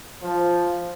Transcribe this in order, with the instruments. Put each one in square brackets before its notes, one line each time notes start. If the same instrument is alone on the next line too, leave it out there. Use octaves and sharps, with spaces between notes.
[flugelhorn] F3